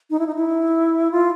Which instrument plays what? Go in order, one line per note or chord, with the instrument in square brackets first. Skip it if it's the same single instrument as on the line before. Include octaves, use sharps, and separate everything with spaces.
[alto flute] D#4
E4
D#4
E4
F4